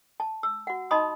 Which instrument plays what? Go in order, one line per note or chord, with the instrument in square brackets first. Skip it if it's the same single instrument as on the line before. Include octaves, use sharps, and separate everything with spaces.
[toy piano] A5
E6
F#4 F#5
D#4 D#5 A5 B5 C6 D#6